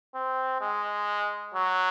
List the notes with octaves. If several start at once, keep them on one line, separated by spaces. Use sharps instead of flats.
C4
G#3
F#3